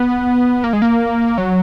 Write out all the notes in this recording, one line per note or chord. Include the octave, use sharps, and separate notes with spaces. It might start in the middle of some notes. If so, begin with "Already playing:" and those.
Already playing: B3
A#3
G#3
A#3
F#3